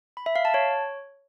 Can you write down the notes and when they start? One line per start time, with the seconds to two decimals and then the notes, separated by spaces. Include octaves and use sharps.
0.17 B5
0.26 E5
0.36 F5
0.45 A5
0.54 C#5